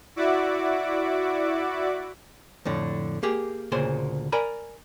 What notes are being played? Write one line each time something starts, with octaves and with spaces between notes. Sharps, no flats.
E4 F#4 D5 E5 F#5 D6
F2 A2 D3
A#3 G4 G#4
D2 A#2 C#3 G#4 C5 C6
A#4 D5 G#5 A#5 B5